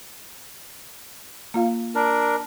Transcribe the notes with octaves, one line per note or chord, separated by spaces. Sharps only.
A#3 F4 F5
D4 A#4